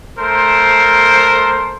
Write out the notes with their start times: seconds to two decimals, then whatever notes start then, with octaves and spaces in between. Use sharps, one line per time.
0.18 A3 A#4 C5